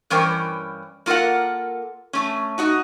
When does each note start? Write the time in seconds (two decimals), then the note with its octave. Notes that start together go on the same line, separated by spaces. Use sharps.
0.10 G2 E3 C#4 A#4 C5 G5
1.06 A#3 F4 A4 A#4 F#5
2.13 A3 C#4
2.58 D#4 F#4 D#5